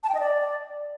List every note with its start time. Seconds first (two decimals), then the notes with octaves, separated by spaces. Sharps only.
0.04 A5
0.09 G5
0.15 D#5
0.20 D5